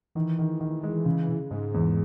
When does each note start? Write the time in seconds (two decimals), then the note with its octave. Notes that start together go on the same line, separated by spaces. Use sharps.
0.15 D#3 E3
0.39 D#3
0.61 D#3
0.83 G#3
1.05 C#3
1.29 C#3
1.51 G#2 G#3
1.74 E2